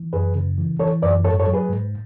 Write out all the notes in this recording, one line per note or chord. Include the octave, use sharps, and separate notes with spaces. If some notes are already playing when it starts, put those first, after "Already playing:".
Already playing: E3
F#2 G#4 B4
C#3
E3
E3 A4 C#5
F#2 B4 D5
G#2 A4 C#5
A4 C#5
F#3
G#4 B4
G#2